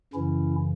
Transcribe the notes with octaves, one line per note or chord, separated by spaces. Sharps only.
F#2 C#3 E3 C#4 E4